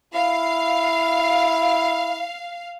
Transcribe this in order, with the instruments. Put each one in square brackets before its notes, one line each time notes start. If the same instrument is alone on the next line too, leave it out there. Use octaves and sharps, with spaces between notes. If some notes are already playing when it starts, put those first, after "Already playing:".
[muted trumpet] E4 [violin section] F5